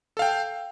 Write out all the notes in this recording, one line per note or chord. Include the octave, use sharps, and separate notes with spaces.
A4 F5 G5